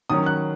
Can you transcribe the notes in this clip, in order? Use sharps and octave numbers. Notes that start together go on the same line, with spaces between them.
D#3 F#3 C#4 D#6
F#6